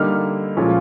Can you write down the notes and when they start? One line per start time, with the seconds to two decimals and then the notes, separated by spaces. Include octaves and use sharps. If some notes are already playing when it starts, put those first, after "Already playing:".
Already playing: D3 G3 A#3 D#4 F6
0.57 A#2 F3 G#3 C#4 F4